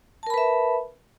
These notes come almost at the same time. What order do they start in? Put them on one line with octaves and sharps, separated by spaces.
A5 A#4 B5 B4 E5